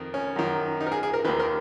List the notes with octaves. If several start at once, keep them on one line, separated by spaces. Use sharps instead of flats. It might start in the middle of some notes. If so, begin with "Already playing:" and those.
Already playing: F2 D#3
C#4
F#2 D#3
D#4
A#4
G#4
G#4
A#4
D#2 D#3 B4
A#4